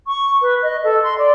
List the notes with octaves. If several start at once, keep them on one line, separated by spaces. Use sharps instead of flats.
C#6
B4
D#5
A4
C6
D5